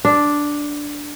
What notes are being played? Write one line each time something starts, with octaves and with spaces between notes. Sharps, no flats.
D4